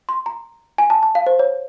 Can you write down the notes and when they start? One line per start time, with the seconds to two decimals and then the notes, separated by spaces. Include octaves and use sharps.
0.09 C6
0.26 A#5
0.78 G#5
0.90 A5
1.03 A5
1.15 F5
1.27 C5
1.39 C#5